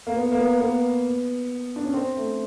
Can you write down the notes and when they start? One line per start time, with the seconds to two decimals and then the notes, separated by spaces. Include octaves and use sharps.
0.07 A#3
0.16 B3
0.32 A#3
0.39 B3
0.61 B3
1.76 D4
1.85 C#4
1.94 C4
2.17 A3